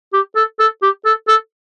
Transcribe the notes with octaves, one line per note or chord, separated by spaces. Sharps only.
G4
A4
A4
G4
A4
A4